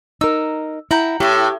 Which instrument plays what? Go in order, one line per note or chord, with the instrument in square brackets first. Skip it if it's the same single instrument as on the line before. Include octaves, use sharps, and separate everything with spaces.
[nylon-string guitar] D#4 A#4 [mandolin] E6
[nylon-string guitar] E4 [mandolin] F#5 G5 A#5
[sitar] A2 [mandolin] E4 A4 [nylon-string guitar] G4